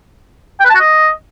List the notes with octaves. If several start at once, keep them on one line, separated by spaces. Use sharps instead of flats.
G5
B4
A5
F#4
D#5